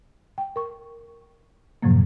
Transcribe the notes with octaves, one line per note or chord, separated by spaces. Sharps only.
G5
A#4 C#6
F#2 A2 C3 F3 F#3 A#3